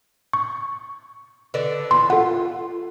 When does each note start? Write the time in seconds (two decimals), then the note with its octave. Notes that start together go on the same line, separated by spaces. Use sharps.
0.33 C#6
1.54 D3 B4 D5
1.91 E2 C6
2.10 F4 A4 F#5